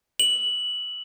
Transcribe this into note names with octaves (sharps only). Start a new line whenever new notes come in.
F#7